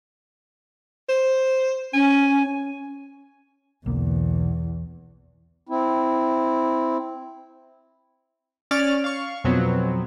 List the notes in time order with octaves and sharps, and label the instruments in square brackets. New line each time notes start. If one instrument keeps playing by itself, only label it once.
[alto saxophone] C5
[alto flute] C#4 [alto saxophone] G#5
[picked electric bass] B1 D3 A#3 [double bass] E2
[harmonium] C4 E4
[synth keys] C#4 D5 D6 F6 A6
F5 C#6
F2 B2 F#3 B3 C4